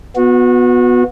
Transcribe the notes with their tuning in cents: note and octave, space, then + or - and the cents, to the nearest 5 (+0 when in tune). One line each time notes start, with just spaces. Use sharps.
B3 +0 F#4 -30